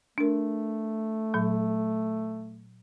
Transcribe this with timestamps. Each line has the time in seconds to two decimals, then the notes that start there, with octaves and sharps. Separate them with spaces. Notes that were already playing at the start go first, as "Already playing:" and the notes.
0.18 A3 D4 A#4
1.34 A#2 F#3